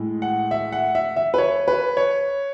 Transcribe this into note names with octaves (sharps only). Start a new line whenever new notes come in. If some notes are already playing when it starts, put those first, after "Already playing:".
Already playing: A2 G#3
F#5
E5
F#5
E5
E5
B4
C#5
B4
C#5